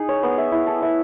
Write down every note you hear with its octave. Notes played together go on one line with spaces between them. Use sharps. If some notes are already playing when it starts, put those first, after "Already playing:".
Already playing: D#4 G#4
C#5
B3
E5
E4
A4
E5